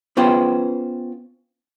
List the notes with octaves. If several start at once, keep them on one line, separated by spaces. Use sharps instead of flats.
B3 C#4 F4 B4 C5 G5